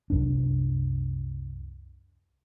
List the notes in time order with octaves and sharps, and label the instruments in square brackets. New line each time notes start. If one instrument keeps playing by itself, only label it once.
[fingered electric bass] C2 F#2 D4